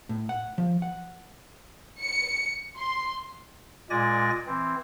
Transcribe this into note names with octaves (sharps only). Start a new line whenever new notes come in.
A2
F#5
F3
F#5
C#7
C6
A#2 G#3 D5 G#5 A#6
E3 C4